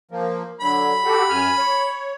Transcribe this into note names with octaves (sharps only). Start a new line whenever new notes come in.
F3 A#3
D3 F#3 B5
F#4 G4 A4
F#2 G#5 F6
C#5